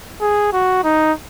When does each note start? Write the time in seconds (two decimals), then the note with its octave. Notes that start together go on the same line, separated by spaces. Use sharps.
0.21 G#4
0.53 F#4
0.84 D#4